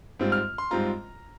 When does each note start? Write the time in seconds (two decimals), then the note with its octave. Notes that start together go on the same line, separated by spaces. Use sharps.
0.19 G#2 G3 C4 F4
0.32 F6
0.58 C6
0.71 G#2 G3 C4 F4 A#5